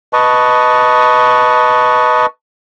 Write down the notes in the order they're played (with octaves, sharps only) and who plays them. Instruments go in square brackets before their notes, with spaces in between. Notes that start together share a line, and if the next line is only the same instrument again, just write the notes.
[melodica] B4 D#5 A5 C#6